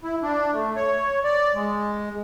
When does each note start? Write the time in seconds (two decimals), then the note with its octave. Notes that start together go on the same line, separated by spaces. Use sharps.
0.03 E4
0.23 D4
0.53 A3
0.76 C#5
1.24 D5
1.55 G#3